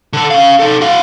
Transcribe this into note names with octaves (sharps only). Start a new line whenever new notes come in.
D3 A4
C#4 F5
D#4 A4
F#4 F5